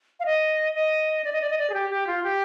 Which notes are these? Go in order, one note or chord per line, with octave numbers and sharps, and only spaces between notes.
F5
D#5
D#5
D5
D#5
D5
D#5
D5
G#4
G4
G4
F4
G4